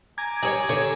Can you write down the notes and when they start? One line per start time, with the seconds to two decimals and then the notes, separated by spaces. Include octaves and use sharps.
0.18 G#5 A#5 D6 G#6
0.43 G3 G#4 C#5
0.69 D3 C#5